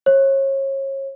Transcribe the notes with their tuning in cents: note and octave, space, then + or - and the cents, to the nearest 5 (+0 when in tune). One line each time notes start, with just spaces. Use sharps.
C#5 -35